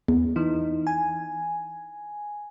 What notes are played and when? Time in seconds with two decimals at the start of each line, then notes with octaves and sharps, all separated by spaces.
0.08 E2
0.36 E3 D#4
0.87 G#5